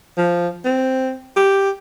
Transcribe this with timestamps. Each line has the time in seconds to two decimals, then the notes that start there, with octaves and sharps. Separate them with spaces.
0.18 F3
0.65 C4
1.36 G4